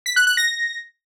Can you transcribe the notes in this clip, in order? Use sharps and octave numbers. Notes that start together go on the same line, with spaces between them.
B6
F#6
F#6
A#6